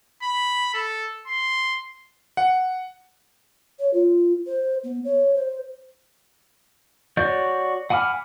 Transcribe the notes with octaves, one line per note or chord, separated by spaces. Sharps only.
B5
A4
C6
F#5
C#5
F4
C5
B3
C#5
C5
F#4 C#5 D5 G6
F#5 G#5 B5 D6 F6